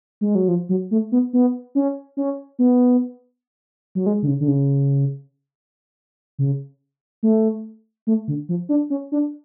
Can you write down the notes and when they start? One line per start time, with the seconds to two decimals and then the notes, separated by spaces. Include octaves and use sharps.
0.21 G#3
0.35 F#3
0.48 F3
0.69 F#3
0.91 A3
1.12 B3
1.33 B3
1.75 C#4
2.17 C#4
2.59 B3
3.95 F#3
4.06 G#3
4.23 D3
4.27 C#3
4.40 D3
4.48 C#3
6.39 C#3
7.23 A3
8.07 A3
8.28 D3
8.49 F3
8.69 D4
8.90 C#4
9.12 D4